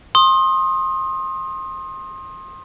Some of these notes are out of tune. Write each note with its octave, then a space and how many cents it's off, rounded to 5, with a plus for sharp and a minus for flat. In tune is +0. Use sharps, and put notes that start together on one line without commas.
C6 +30 D#6 +0